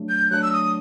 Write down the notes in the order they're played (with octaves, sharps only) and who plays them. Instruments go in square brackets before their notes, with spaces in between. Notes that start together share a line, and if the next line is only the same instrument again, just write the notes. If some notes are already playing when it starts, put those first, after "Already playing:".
Already playing: [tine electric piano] F#3 A3 D4
[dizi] G6
[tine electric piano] F#3 A3 D4 [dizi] F#6
[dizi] E6
D#6